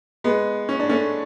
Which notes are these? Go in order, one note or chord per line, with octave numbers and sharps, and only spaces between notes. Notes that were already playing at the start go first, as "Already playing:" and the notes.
G#3 B3
C#4
D4
A3 C#4